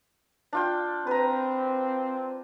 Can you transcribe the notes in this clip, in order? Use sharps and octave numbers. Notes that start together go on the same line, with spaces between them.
D4 F4 G5
C4 B4 A#5